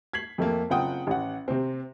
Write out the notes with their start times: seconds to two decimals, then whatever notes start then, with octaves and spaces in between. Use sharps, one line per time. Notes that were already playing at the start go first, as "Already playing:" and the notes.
0.13 G#6 B6 C7 F#7
0.38 F2 A3 A#3
0.70 F#1 C4 F4 F#5 G5 D#6
1.07 A1 F#5
1.48 C3 C4